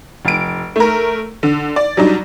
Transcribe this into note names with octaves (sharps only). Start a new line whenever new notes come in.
F1 D7
A3 A#4
D3
D5
F#3 G3 D4 D#4